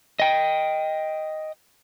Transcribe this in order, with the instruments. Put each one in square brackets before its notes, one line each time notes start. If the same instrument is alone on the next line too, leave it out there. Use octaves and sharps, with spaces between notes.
[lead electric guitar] D#5 G5